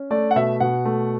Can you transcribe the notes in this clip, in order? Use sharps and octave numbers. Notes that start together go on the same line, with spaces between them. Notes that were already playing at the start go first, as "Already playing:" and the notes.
Already playing: C#4
A3 D5
F#5
B2 E5
B2 F#5
A3